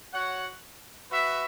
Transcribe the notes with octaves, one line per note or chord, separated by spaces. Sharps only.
F#4 C#5 F#5
F#4 B4 E5